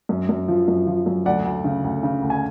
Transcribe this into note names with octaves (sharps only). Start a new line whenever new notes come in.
F#2
F#2
F3
F#2
F3
F#2
D2 D5 F#5
D2
C#3
D2
C#3
D2
G#5